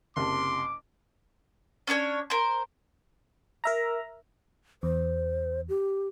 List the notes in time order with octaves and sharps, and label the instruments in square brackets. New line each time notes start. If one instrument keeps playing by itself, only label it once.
[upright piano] F#1 C3 A5 [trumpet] C6 [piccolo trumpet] D6
[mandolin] C#4 D4 A4 C#5
A#4 C5
[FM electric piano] A#4 E5 A#5
[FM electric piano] E2 [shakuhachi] C5
[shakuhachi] G4